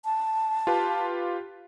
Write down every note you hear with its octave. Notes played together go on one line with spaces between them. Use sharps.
A5
F4 G4 B4